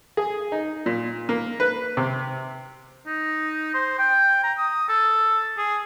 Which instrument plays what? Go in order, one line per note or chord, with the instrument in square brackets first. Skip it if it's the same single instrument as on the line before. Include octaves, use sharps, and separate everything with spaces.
[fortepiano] G#4
D#4
A#2
A#3
B4
C3
[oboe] D#4
C5
G5
A#5
D#6
A4
G#4